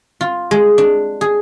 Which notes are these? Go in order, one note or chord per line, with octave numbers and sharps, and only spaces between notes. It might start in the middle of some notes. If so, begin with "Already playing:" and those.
F4
G#3
D4
G#4